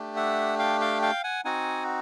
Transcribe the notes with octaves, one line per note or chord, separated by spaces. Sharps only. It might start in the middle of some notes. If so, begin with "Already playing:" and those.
Already playing: A3 D4 G4
E5 F#5
F5 G5
F5 G5
F5 G5
F#5 G#5
C4 D#4 F#4 F#5 G#5